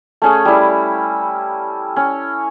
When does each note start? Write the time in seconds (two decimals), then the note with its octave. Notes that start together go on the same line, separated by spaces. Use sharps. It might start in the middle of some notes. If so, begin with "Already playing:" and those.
0.22 A3 C#4 G#4
0.45 G3 E4
1.96 C#4